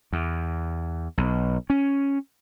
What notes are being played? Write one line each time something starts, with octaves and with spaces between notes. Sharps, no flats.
E2
B1
C#4